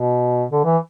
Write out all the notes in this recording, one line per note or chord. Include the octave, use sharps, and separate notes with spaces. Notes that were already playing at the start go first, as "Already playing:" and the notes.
Already playing: B2
D3
E3